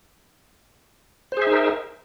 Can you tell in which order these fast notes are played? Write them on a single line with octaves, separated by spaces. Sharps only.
C5 G#4 E5 D#4 A#4